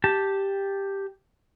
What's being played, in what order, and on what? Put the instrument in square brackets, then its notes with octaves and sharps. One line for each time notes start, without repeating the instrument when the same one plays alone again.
[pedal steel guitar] G4 A5